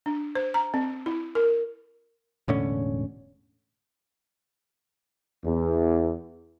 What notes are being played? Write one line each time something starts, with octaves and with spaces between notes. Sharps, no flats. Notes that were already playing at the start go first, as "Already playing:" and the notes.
D4
C5
A#5
C4
E4
A#4
E1 A2 D3 C#4
E2